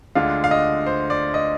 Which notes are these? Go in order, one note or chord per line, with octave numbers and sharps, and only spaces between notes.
D2 D3 G#3 D4 F4 F5
F5
D#5
C5
D5
D#5